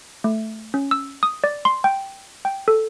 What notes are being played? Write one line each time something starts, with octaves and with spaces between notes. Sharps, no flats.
A3
C#4
E6
D#6
D5
C6
G5
G5
A4